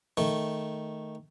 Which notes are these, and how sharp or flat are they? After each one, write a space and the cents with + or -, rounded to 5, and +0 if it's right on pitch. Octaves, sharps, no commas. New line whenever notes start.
D#3 +0 A3 +0